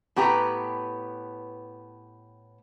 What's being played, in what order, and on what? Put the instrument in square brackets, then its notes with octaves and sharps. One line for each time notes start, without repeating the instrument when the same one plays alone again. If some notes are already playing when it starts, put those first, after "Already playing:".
[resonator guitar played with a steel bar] A2 B3 G4 B4 A#5